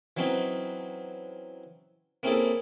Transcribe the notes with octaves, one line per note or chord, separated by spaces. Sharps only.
E3 F#3 C4 C#4 D#4
A#3 C4 C#4 E4 G#4 A4